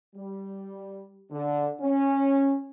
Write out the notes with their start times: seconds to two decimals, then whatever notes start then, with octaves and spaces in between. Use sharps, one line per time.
0.16 G3
1.31 D3
1.81 C#4